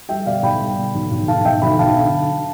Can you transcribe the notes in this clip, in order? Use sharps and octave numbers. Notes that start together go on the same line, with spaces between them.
G3 E5 G5
B2 D5 F5
B1 G5 B5
G3
B2
B1
B1
B1 F5 A5
B1 E5 G5
B1 G5 B5
B1 F5 A5
D3